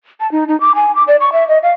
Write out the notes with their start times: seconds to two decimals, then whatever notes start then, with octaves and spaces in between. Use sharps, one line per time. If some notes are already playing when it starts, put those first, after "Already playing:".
0.20 A5
0.32 D#4
0.48 D#4
0.60 D6
0.75 G#5
0.95 D6
1.08 D5
1.21 C#6
1.33 E5
1.49 D#5
1.63 F5